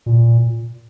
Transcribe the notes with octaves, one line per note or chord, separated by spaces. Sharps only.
A#2